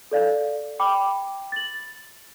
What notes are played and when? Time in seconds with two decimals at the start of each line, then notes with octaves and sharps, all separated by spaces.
0.11 A4 D5 F5
0.80 G5 B5 D6
1.52 A6 F#7